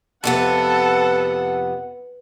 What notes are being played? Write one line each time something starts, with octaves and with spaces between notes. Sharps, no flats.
F2 C3 B3 A4 B4 F#5